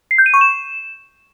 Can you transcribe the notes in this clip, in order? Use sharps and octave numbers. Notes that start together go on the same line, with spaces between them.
C7
G6
D#7
C#6
E7